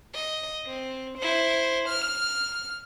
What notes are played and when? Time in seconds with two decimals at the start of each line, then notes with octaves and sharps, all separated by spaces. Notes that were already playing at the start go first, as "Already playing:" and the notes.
0.14 D#5
0.66 C4
1.18 E4 C5
1.88 F6